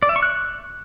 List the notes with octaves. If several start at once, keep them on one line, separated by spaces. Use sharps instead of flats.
D5
E5
C#6
F#6